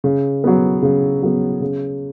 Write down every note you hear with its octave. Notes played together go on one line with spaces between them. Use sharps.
C#3
F#3 B3
C#3
F#3 B3
C#3